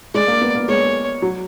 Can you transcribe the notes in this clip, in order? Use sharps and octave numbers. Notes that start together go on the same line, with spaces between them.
G#3 D5
A#3
B3
A#3
G#3 C#5
F#3